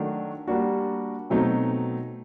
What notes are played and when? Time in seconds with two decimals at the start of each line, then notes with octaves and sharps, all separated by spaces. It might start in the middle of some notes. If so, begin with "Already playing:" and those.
Already playing: D#3 F#3 A3 D4 F#4
0.48 G3 A#3 D4 F#4
1.30 B2 F#3 A3 C4 D#4